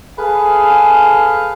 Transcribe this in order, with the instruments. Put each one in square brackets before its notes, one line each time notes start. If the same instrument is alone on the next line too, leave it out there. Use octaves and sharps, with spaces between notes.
[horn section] G#4 A4 B4 F5